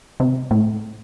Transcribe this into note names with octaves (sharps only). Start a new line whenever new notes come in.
C3
A2